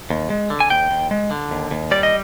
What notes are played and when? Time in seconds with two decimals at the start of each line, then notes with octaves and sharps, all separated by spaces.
0.10 D#2
0.30 G#3
0.50 D3
0.60 G#5
0.70 D#2 G5
0.91 D#2
1.11 G#3
1.31 D3
1.51 D#2
1.71 D#2
1.91 G3 D5
2.03 D#5